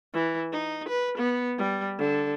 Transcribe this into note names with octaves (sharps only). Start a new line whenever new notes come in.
E3
D#4
B4
B3
G3
D3